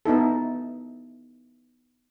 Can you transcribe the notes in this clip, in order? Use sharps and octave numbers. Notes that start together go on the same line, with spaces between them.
B3 D#4 E4 A4